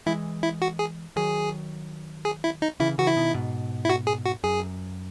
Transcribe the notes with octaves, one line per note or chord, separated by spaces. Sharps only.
E3 G#3 E4
E4
F#4
G#4
D#3 F#3 G#4
G#4
E4
D#4
C#3 E3 E4
C#3 E3 F#4
E4
B2 D#3
G#2 B2
E4
F#4
G#4
F#4
F#2 G#4